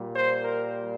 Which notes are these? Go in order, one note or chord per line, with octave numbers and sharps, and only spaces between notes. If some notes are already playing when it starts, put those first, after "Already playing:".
Already playing: A#2 G3
C5
A#4